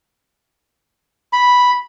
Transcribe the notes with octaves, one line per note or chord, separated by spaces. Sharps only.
B5